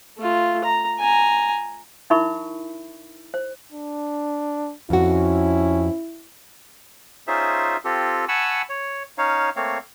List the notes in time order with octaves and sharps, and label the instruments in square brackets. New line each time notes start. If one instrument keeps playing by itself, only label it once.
[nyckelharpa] A3 F4
A#5
G#5 A#5
[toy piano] D#4 E4 A#4 E5 B5 C#6
C5
[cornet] D4
[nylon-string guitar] F2 F#4 [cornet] C#4 [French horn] E4
[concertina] C#4 D#4 F4 G#4 C5 E5
C4 F4 G4 A4
F#5 G#5 A5 B5 C#6 E6
C#5
C#4 D#4 C#5 F5
A3 A#3 C4 C#5 F5